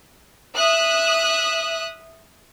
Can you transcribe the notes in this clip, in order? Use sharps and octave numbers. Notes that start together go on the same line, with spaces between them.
E5 D#6 F#6